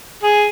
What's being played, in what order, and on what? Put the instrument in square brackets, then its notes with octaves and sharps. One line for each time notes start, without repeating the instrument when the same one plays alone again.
[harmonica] G#4